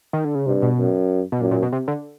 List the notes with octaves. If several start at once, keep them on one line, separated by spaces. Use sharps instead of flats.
D#3
D3
C#3
G2 C3
B2
F#2
B2
F#2 A#2
A#2
B2
C3
D3